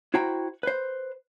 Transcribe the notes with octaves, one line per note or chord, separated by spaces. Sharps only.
E4 F#4 C5 G5 A#5
B4 C5